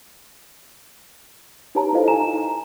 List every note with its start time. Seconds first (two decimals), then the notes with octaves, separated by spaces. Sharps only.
1.75 D#4 G4 B4 C#5 A5 A#5
1.93 E4 F4 A4 C5 D#5 F5
2.08 D#4 G#5 A#5 E7
2.38 A#5